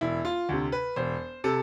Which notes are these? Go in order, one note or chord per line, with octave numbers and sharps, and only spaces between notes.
E1 E4
F4
D2 C3
B4
E1 C5
C3 A4